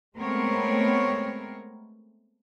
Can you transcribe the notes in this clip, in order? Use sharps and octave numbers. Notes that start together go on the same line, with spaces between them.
G#3 A3 B3 C4 A#4 C#5